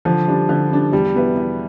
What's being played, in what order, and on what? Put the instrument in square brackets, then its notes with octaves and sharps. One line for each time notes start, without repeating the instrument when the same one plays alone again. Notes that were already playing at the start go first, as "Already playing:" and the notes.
[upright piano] D3 [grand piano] F3
[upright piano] G3 D4
D3
G3 D4
[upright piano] E2 [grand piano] G3
[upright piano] B2 B3 E4
E2